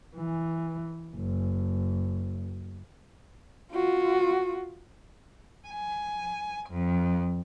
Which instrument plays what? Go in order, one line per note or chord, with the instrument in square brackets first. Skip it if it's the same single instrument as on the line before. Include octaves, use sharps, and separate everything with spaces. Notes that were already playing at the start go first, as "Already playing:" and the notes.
[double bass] E3
F#1
[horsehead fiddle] F4 F#4
[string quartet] G#5
F2